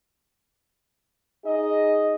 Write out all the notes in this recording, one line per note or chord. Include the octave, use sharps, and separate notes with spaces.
D#4 G#4 D#5